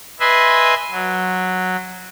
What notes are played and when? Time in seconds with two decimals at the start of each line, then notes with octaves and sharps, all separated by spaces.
0.20 B4 D#5 E5 G#5 C6
0.91 F#3